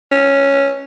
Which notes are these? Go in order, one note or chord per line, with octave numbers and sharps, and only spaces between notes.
C#4